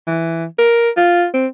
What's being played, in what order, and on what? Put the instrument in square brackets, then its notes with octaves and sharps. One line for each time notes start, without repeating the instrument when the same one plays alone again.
[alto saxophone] E3
A#4
F4
C4